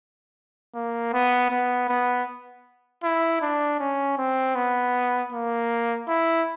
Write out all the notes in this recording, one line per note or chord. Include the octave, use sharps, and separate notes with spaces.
A#3
B3
B3
B3
E4
D4
C#4
C4
B3
A#3
E4